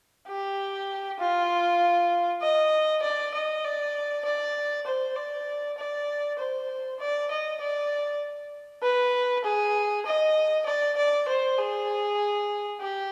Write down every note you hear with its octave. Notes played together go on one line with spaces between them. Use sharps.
G4
F4
D#5
D5
D#5
D5
D5
C5
D5
D5
C5
D5
D#5
D5
B4
G#4
D#5
D5
D5
C5
G#4
G4